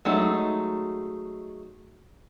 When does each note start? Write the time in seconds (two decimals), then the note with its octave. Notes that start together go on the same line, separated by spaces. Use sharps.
0.05 F#3 G#3 A3 D#4